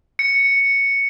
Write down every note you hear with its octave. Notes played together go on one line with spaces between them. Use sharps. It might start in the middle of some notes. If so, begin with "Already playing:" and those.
C#7